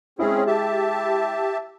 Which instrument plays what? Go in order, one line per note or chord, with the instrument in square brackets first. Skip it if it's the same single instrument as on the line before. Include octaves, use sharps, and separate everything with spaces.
[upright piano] G#3 E4 [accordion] C4 C#4 G#4
[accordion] G4 E5 A5